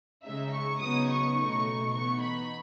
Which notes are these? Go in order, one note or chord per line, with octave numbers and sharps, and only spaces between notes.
C#3 G#3 D#4 E5
C#6
C#3 F#3 B3 D#4 D#6
C#6
B2 A3 D#4
E3 B3 D#4 C#6
B5